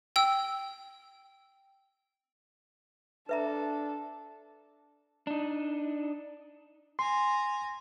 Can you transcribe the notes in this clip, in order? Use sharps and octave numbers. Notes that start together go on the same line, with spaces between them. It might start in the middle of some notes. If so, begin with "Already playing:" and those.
G5 E6
D4 A4 B4 E5 A#5
D4 D#4
G#5 A#5 C6